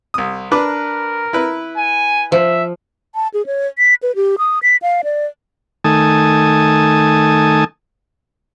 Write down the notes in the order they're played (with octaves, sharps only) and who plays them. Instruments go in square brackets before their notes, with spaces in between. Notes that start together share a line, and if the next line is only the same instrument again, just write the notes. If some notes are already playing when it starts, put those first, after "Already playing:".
[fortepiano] C2 D#6
[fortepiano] D4 B4 D6 [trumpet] A#4
[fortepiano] E4 B4
[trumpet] G#5
[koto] F3 [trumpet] E5
[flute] A5
G#4
C#5
B6
B4
G4
D#6
B6
F5
D5
[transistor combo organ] D#3 A3 G#5 A5 D#6